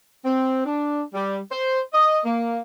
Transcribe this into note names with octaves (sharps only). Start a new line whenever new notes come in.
C4
D4
G3
C5
D#5
A#3